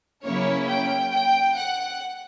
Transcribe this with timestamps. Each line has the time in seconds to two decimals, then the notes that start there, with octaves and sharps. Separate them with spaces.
0.24 C#3 F#3 A#3 C#4 E4 C#5
0.69 G5
1.13 G5
1.57 F#5